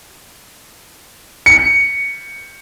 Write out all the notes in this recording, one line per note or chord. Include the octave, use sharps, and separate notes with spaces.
C#7